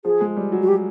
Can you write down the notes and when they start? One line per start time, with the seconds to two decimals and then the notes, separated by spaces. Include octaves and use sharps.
0.05 F3 G#4
0.21 G#3
0.36 G3
0.52 F#3
0.62 F#4
0.68 G4